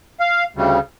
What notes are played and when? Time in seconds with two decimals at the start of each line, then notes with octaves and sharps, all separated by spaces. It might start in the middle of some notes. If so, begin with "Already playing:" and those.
0.20 F5
0.54 D2 C#3 G3